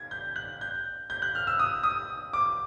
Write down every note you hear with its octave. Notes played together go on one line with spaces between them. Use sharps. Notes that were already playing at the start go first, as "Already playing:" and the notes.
Already playing: G#6
G6
F#6
G6
G6
F#6
F6
E6
D#6
D#6
D6